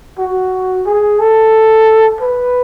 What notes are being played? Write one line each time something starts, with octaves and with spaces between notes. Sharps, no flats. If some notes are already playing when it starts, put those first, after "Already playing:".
F#4
G#4
A4
B4